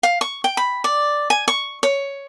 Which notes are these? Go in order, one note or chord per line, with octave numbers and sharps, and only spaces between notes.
F5
C#6
G5
B5
D5
G#5
C#6
C#5